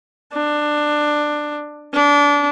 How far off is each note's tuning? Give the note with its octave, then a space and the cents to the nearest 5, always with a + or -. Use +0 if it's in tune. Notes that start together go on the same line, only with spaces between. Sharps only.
D4 +15
D4 -25